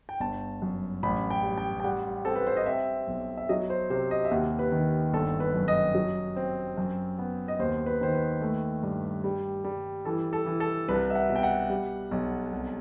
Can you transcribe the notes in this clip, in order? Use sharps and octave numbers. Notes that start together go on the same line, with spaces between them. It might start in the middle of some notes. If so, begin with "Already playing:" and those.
G5
G1 A5
F#2
A1 B5
G5
G3
G5
G5
G3 F#5
C4 A4
B4
C5
D#5
C4 E5
B1
E5
F#3 D#5
C5
C3 C5
D#5
E5
D#2 F#5
B4
D#3
G1 A4
B4
F#2
D#5
F#3
C4
F#2
B3
D#5
D#2 C5
B4
D#3 C5
B4
A3
G2
G3
G3
E3 A4
A4
E3
A4
C2 B4
E5
F#5
B2
G5
F#5
G3
B1
C2